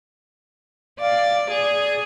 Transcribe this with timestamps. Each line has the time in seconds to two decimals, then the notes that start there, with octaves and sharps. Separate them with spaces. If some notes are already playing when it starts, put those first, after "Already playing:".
1.00 D5 F5
1.51 G#4 D5